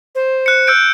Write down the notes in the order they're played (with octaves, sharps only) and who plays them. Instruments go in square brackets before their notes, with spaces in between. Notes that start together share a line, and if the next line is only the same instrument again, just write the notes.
[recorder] C5
[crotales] F#6 C#7
E6 G6 D7